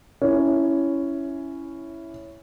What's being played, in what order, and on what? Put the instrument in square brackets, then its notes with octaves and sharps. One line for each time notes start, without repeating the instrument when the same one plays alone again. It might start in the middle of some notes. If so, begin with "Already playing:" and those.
[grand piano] C#4 E4